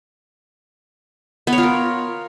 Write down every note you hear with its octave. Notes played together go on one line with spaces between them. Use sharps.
B3
C#5
F4
A#4